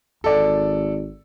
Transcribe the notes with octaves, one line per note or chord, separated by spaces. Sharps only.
G#1 A4 D5